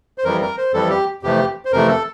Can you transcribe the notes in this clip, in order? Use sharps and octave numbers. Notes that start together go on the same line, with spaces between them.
C5
F2 E3 G3 A#4
A#4
C5
F2 E3 G3 A4
G4
F2 C3 E3 A3 G4
C5
F2 C3 E3 A3 A#4
A4